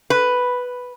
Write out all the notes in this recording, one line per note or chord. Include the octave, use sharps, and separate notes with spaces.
B4